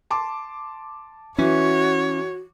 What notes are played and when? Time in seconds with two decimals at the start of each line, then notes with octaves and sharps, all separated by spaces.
0.11 A5 C6 D6
1.38 E3 C#4 F#4 C#5